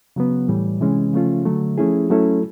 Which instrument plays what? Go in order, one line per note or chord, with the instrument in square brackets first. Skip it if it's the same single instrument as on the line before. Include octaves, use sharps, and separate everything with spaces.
[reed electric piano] C#3 F#3 B3
A2 E3 G3
C3 E3 G#3 C#4
C#3 F3 A3 C#4 F4
D3 F#3 A3
F3 A3 C#4 E4 G#4
F#3 A3 C#4 E4 A4